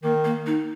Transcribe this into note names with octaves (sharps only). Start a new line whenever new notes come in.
D#3 A#3
A#3
D#4